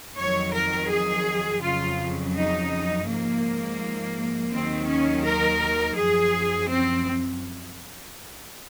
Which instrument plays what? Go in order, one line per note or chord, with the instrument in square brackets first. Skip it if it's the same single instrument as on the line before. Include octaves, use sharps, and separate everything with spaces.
[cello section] F2 D#3 F#3 C#5
A#4
G#4
F2 C#3 F#3 F4
D#4
G#2 F3 A#3
D#2 D#3 F#3 C4
C#4
A#4
F#2 F3 G#4
C4